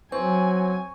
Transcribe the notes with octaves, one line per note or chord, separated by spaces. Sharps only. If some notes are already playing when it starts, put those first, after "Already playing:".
F#3 C4 G#5 C#6